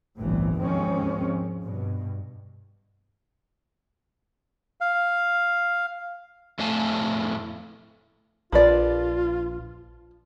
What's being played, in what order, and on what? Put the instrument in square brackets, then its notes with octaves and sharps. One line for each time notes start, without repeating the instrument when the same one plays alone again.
[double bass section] G1 C2 A2 C3 E3
D#2 G#2 F3 G#3 C4 C#4
G2 B2
[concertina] F5
[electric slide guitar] F2 A2 A3 F5 G#5 A5
[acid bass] A#1 [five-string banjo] F3 B4 D5 [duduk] F4